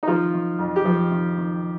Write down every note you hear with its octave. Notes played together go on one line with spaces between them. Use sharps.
D#4
D#3 F3 F4
D#3
F2
G4
F2 F3 F4
D#3
D#3